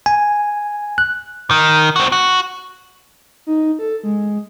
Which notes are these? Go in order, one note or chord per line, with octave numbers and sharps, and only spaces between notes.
G#5
F#6
D#3
C4 F#4
F#4
D#4
A4
G#3